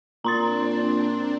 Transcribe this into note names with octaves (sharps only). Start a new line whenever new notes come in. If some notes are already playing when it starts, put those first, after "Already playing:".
A#2 C4 D4 A#5 C6 A6